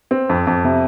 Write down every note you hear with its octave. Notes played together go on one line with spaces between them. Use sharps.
C4
F2
F2
C3